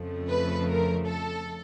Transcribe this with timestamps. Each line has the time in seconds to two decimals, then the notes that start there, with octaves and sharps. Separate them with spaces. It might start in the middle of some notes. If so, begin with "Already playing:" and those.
Already playing: F2 C#3 F3 A3
0.28 B4
0.68 A#4
1.06 A4